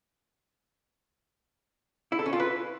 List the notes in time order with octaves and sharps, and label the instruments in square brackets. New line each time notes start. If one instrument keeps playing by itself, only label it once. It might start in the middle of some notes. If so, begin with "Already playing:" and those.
[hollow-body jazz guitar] E4
A4
C#4
F4
B4